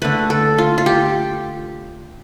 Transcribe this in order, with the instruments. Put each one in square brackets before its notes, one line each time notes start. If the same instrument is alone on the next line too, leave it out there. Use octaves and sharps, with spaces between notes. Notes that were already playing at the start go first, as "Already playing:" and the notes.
[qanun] D3 A3 B4
A4
F4
F4
G4